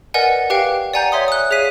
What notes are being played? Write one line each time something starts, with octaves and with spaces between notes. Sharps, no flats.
A#4 B4 D5 D#5 F#5 G#5
G4 B4 F5 G5
D5 F#5 G#5 A#5 G6
C#5 E5 C6 D#6
D#6 F#6
G#4 C#5 E5 F5 B6 D#7